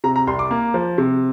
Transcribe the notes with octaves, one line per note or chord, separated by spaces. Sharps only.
C3 A#5
A#5
C2 C6
D6
A#3
F3
C3